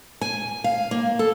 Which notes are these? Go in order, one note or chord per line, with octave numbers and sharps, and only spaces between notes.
G#5
F5
A#3
A4